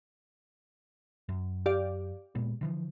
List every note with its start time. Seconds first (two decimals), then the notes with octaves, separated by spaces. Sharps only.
1.29 F#2
1.66 G4 D5 F5
2.35 A#2 G#3 B3
2.61 D3 E3 F3